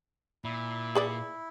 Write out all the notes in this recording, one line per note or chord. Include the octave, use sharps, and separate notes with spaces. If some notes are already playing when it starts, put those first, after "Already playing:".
A#2 E4
G#4 B4 D5